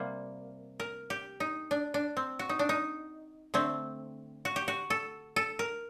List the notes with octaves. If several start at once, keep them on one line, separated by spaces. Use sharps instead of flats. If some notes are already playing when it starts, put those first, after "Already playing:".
Already playing: C3 G3 A#3
A#4
G4
D#4
D4
D4
C4
F#4
D#4
D4
D#4
D3 A3 C4
F#4
G4
F#4
A4
A4
A#4